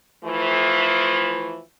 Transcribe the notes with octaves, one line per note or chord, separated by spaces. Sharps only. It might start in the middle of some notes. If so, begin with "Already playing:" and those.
E3 F3 A3